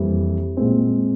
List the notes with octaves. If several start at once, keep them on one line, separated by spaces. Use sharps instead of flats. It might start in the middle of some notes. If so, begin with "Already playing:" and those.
Already playing: F2 E3 G3 A#3 E4
A#2 G#3 C4